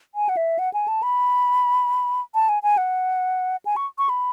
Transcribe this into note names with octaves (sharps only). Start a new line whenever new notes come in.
G#5
F#5
E5
F#5
G#5
A5
B5
A5
G#5
G#5
F#5
G#5
C#6
C#6
B5